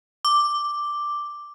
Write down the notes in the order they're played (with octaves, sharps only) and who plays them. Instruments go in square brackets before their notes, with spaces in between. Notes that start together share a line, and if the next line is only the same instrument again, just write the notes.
[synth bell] D6